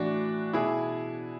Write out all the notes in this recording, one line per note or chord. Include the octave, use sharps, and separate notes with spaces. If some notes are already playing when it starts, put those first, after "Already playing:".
Already playing: A2 E3 D4 F#4
B2 E4 G#4